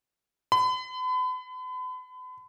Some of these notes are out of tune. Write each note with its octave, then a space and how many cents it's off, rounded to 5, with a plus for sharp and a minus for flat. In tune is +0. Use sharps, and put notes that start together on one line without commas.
B5 +40